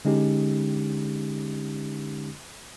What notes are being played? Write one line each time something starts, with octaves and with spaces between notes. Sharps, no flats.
D3 G#3 C#4 D#4 G4